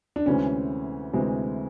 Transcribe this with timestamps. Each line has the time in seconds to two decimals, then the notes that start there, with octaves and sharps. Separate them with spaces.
0.16 D4
0.26 D2 C3 E3 G#3 C4 C#4
1.13 D2 C3 E3 G#3 C4